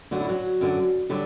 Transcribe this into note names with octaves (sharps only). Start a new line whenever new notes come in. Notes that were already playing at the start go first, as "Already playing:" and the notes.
F#2 D3 F#3 F#4
E4
F#3 F#4
F#2 D3 F#3
D3 F#3 G3 G4